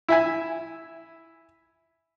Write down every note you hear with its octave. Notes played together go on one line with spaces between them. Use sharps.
E4 E5 G#5